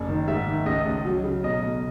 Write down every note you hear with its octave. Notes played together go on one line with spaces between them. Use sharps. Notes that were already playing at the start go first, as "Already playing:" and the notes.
Already playing: F#1
D#3
G#2 E5
D#3
C#2 D#5
C#2
F#3
C#3
B1 D#5
B1